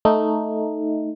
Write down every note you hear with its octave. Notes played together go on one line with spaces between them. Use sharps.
A3 D#4